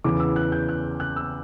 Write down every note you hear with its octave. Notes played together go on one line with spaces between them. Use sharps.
E2 C#3 E3 B3 D6
E6
F#6
G6
F#6
F#6
E6